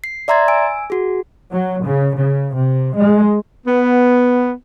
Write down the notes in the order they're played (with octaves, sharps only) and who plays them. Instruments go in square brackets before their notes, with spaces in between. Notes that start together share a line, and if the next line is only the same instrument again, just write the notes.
[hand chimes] C7
D5 E5 A#5 C6 G#6 A6
G#5 E6 D7
F#4 G#4
[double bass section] F#3
C#3
C#3
C3
G#3
[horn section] B3